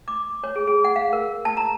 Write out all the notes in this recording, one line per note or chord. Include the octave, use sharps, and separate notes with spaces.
D6
C#5
G#4
G#4
F#5
F5
A#4
A5
A#5